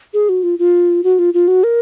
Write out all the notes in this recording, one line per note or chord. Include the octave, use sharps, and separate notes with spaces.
G#4
F#4
F4
F4
F#4
F4
F4
F#4
A#4